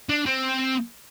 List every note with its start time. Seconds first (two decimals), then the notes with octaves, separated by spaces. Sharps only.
0.09 D4
0.26 C4